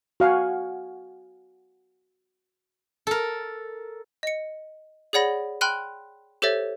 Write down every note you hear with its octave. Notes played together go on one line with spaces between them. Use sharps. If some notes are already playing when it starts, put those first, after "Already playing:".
F#4 F5 F#5 G#5
A4 A#4
D#5 C#7
G#4 C#5 D5 F#5 B5 A#6
G5 B5 C6 F6 F#6 D#7
G4 A4 C5 C#5 E5 A6